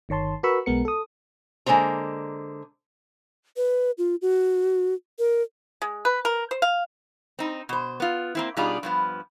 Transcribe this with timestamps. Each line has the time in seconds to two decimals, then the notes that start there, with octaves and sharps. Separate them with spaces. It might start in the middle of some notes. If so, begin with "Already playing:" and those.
0.09 G1 D#3 C#5 A5 C6
0.43 F#4 A#4 B4 B5 C#6 E6
0.66 B1 B2 G#3 B3 A#4 C#7
0.85 A4 D#6
1.66 D3 G#3 A#3 C5 A#5
3.57 B4
3.98 F4
4.22 F#4
5.19 A#4
5.82 G#3
6.05 B4
6.25 A#4
6.51 C5
6.62 F5
7.39 C4 D#4
7.69 B2 C5
8.00 B3 F4
8.35 A#3 C4 E4
8.57 B2 G3 D4 D#4 F4 G#4
8.83 G2 F3 B3